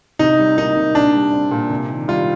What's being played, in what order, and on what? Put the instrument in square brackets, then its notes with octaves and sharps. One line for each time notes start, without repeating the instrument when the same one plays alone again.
[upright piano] C3 [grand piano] D#4
[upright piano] G3
[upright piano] A#3 [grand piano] D#4
[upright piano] C3
[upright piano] A#2 [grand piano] D4
[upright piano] G3
C4
A#2
C3
D#3
[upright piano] G3 [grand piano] F4